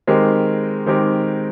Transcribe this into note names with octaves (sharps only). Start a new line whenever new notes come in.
D#3 G#3 C4 G4 A#4
D#3 G#3 C4 G4 A#4